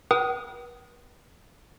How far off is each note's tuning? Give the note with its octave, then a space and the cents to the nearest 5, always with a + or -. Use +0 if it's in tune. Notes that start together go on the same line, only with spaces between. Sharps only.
B4 -40 G5 -45 D#6 +0